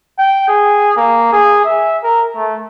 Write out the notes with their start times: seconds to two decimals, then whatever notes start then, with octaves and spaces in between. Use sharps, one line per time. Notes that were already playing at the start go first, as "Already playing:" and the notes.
0.18 G5
0.48 G#4
0.97 A#3
1.33 G#4
1.65 E5
2.03 A#4
2.36 A3